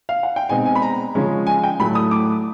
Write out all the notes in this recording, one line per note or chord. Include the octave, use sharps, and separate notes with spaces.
F5
F#5
G5
B2 G#3 C4 D#4 G#5
G#5
B5
A#5
C#3 F3 G#3 C#4
G#5
G5
A2 F#3 A3 B5
D#6
D6